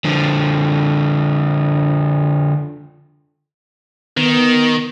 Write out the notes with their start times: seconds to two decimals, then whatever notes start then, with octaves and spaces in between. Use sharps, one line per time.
0.05 D3 F3
4.17 D#3 B3